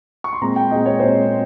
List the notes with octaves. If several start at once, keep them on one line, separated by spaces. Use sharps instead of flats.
C#6
C6
A#2 G#3 C4 A#5
G5
A#2 G#3 C4 D#5
C#5
A#2 G#3 C4 C5
C4